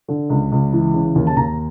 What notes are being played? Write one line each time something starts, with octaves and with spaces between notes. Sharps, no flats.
D3
C#2
C#2
E3
C#3
D#2
A5
D#2 A#5